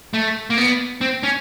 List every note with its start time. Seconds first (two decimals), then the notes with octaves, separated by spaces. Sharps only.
0.14 A3
0.50 A#3
0.58 B3
1.01 C4
1.23 C#4